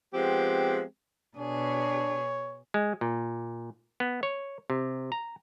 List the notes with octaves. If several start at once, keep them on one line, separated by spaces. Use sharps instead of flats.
F3 G#3 B3 C4 G4
B2 D4 G#4 C#5
G#3
A#2
B3
C#5
C3
A#5